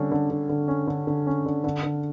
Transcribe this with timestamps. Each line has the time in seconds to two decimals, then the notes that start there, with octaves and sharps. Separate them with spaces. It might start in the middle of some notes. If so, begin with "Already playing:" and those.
Already playing: D3 G3 C#4
0.11 D3
0.30 D3
0.49 D3
0.68 C#4
0.87 D3
1.07 D3
1.27 C#4
1.46 D3
1.64 D3
1.83 D3